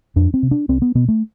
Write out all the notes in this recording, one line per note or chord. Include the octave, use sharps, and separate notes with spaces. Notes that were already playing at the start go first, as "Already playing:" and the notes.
F2 D4
C4
C3
D4
C2 C4
B3
B2 B3
A3